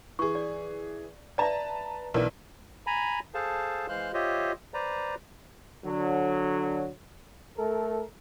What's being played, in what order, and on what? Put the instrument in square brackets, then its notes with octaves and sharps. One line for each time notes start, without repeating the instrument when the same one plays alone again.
[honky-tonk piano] E3 G#4 [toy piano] C#6
[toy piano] D5
[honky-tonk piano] B4 A5 A#5 [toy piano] D5 E5
[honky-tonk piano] B1 E3 [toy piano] A#4 D5
[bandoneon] G#5 A#5 B5
G#4 A4 C5 F5 A5
E3 G#3 C5 F5 C6 F#6
F4 G4 C5 C#5 D#5 E5
B4 C5 D5 A#5
[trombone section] D3 F#3
A3 A4 A#4